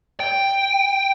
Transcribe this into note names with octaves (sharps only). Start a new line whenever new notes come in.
G5